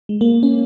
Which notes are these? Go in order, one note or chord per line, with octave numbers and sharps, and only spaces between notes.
G#3
A#3
C#4